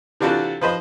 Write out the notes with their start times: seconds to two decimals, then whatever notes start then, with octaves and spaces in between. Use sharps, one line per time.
0.20 C3 E3 D4 F4 F#4 A4
0.61 F3 B4 C5 D#5